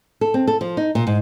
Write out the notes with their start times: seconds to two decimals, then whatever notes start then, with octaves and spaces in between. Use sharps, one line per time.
0.21 A4
0.34 C4
0.47 A4
0.61 F3
0.77 D#4
0.95 A#2
1.07 G#2